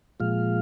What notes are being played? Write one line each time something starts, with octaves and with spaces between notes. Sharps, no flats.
A#2 F3 G#3 F5